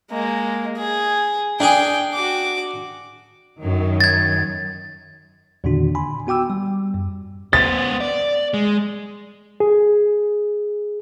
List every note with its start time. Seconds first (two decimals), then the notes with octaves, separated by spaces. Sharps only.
0.11 G#3 A#3
0.78 G#4
1.60 D4 G#4 G5
2.14 F#4 D6
3.61 F#2 D#3 F#3
4.00 G#6 A6
5.64 E2 A#2 D3 D#3 D4 F#4
5.95 G#5 B5 C6
6.27 B3 F#4 G5 D6 E6
6.50 G3
6.94 F#2
7.53 B3 C5 A6
8.01 D5
8.54 G#3
9.60 G#4